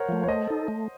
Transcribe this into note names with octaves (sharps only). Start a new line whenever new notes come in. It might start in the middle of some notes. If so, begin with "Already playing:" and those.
Already playing: A#4 C5 C#5 F#5
F3 A3
C#5
A3 C5 D#5
D#4 A4
A3